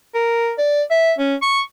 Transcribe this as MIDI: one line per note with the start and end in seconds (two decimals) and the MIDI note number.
0.15 0.52 70
0.58 0.82 74
0.91 1.12 76
1.18 1.35 61
1.42 1.60 85